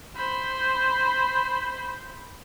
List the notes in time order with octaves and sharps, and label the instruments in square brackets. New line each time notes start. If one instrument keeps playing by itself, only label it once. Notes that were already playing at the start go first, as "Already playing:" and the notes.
[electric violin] C5 B5